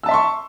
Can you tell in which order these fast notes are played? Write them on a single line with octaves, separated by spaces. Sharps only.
E6 A5 E5 C6 C#6